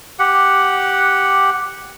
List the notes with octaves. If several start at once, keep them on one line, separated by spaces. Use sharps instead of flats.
G4 F#5